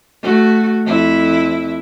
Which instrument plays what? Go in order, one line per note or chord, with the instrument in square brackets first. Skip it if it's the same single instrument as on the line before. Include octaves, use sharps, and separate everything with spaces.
[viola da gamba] A3 F#4
F2 E4